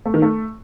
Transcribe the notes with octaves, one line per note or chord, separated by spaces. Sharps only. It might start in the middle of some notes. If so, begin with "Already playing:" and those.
A3
D#3
A3